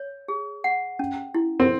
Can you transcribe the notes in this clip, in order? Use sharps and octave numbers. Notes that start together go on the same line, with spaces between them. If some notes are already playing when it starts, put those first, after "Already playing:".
Already playing: C#5
G#4
F#5
C#4
E4
C4